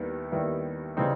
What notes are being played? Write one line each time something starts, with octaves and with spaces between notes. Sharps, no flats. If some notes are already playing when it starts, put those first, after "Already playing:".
Already playing: D#2 D#3 G3 B3 E4
D#2 D#3 G3 B3 E4
C#3 E3 G3 C4 D#4